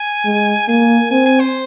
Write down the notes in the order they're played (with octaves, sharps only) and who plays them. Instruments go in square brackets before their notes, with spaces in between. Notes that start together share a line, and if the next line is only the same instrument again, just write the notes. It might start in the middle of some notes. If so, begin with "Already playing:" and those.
Already playing: [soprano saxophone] G#5
[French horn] G#3
[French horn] A#3 [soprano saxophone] G#5
[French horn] C4 [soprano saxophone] G#5
[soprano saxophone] G#5
C5